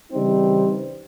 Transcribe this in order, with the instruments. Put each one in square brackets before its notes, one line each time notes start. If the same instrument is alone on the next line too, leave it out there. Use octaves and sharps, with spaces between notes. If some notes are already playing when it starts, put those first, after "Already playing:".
[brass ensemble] C#3 E3 G3 C4 D#4